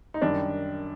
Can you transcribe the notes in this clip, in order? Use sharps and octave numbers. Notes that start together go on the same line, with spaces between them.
D#4
F#2 D#3 G3 D4